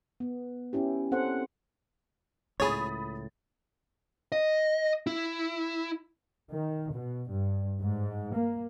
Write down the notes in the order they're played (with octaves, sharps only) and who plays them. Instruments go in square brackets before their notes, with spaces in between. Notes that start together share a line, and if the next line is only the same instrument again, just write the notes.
[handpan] B3
C#4 E4 G4
C4 A4 C5 F#5
[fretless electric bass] C#2 A2 [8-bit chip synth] G#4 C#5 [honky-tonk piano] B5 D#6 A6
[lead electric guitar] D#5
E4
[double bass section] D#3
B2
G2
G#2
A#3